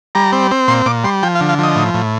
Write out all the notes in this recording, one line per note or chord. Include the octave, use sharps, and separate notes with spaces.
G3 A#5
C4
C4
A#2 C6
A#2 D6
G3 C6
F3 G5
F5
D3
F5
F3 D#5
A2
A2